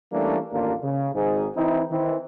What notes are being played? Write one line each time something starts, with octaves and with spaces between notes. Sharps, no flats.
E3 G3 A3 A#3 C#4 D4
A1 D#2 A#3 D4 F4 A#4
C#3
G#1 G#2 G#4
E3 C4 D#4 E4
D#3 E3 C4